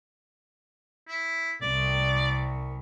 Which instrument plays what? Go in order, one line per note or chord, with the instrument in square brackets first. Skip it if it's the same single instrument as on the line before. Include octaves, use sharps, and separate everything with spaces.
[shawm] E4
[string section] C2 [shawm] D5